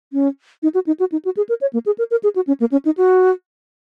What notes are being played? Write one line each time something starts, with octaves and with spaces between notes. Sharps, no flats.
C#4
D#4
F#4
D#4
F#4
D#4
F#4
G#4
A#4
C#5
A#3
G#4
A#4
A#4
G#4
F#4
C#4
A#3
C#4
D#4
F#4